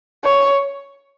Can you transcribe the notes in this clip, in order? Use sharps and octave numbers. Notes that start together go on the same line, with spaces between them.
C#5